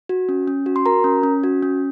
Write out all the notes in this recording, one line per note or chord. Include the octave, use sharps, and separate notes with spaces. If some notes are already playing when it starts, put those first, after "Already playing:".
F#4
C#4
C#4
F#4
C6
F#4 A#4 A#5
C#4
C#4
F#4
C#4